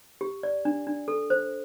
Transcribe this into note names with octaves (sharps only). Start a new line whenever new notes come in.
G4
D5
D4
D4
A4
C5